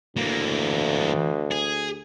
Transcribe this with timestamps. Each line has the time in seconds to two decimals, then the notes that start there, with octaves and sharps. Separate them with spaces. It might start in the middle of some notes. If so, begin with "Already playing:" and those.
0.17 D2 E3 A#3
1.51 G#4